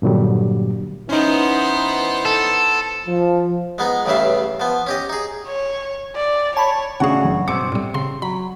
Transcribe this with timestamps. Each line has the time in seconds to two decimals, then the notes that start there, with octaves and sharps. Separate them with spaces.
0.02 G2 A#2 D3 F#3 G3
1.09 E3 B3 C#4 D#4 C5
2.25 A4
3.07 F3
3.78 G#3 B3 D#4
4.06 A1 G2 C#3 E3 E5 F5
4.60 F3 B3
4.87 C#4 G4 D#5
5.09 D#4 G#4
5.47 C#5
6.15 D5
6.57 C#5 A5 B5
7.00 A2 C#3 D4 F#4 G#4 F#5
7.24 F#1
7.48 G2 B2 C4 D6 C#7
7.72 A2 C3 G3
7.94 C#3 C6
8.22 F#3 B5